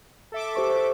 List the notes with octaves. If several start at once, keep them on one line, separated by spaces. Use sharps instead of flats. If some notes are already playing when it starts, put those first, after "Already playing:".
A4 E5 D6
G4 C5 C#6